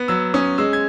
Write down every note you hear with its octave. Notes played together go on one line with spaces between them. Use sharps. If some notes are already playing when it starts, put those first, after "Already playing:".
Already playing: B3
F#3 E6
C#4 D#6
G#3 E6
G#6